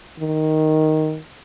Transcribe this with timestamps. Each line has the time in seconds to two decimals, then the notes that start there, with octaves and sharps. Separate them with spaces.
0.20 D#3